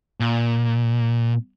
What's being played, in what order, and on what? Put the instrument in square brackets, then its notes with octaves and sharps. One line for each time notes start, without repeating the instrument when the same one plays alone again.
[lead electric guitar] A#2